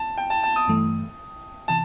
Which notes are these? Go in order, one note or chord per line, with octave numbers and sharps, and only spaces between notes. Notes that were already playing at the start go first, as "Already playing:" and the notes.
Already playing: A5
G5
A5
A5
D#6
G2 E3 A3
C3 E3 A5